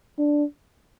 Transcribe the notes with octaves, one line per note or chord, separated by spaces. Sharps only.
D4